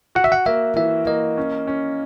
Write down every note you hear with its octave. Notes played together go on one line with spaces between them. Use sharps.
F#4 F#5
E5
F#5
A#3 E5
E3 E5
A#3 D#5
C#4
C#4